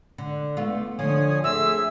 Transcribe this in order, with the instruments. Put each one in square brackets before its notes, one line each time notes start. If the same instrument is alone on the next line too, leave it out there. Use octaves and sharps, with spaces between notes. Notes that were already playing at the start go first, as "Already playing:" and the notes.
[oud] D3
A3 B3 F4
[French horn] D3 [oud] F3 [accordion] C#5 G#5 D#6
[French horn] A3 [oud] C4 [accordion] G#4 E5 [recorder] E6